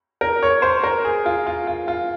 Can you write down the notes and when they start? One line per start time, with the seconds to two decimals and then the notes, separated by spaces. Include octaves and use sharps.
0.21 A#4
0.43 C#5
0.62 C5
0.84 A#4
1.05 G#4
1.26 F4
1.47 F4
1.67 F4
1.88 F4